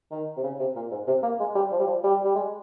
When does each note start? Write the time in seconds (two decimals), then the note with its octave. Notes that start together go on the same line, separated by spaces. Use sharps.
0.11 D#3
0.37 C3
0.44 C#3
0.59 C3
0.75 A#2
0.91 G#2
1.07 C3
1.23 A#3
1.40 G#3
1.55 G3
1.72 F3
1.80 G3
1.87 F3
2.04 G3
2.25 G3
2.35 G#3